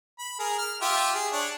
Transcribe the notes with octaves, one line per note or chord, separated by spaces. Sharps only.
B5
G#4 A#4
F6
F4 G4 E5
G#4
D4 C#5